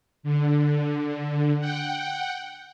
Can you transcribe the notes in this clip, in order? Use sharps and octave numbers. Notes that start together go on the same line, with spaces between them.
D3
F#5 G5